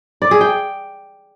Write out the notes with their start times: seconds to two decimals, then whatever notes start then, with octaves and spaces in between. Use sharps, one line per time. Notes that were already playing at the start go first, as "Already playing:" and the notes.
0.22 D5
0.31 G#4
0.41 G5